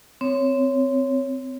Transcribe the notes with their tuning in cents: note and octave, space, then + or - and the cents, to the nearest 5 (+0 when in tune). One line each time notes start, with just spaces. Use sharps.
C4 -15 C#5 +0